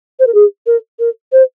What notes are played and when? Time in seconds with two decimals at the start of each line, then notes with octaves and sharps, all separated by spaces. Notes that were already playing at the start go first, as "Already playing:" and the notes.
0.19 C5
0.27 A#4
0.34 G#4
0.67 A#4
0.99 A#4
1.32 C5